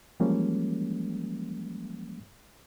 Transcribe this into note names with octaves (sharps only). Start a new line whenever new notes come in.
E3 F3 G3 G#3 A#3 C#4